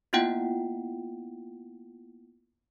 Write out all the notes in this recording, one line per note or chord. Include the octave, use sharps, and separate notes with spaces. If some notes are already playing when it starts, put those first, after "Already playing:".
A#3 B3 E4 F4 F#5 G5